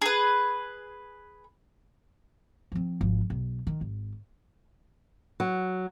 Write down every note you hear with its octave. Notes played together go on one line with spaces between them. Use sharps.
G#4 B4
F3 C4
G#1 F3
B1
D#3
G#1
F#3